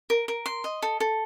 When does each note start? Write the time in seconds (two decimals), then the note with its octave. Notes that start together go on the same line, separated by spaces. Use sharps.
0.10 A#4
0.28 A#4
0.46 C6
0.64 D#5
0.82 A4
1.00 A4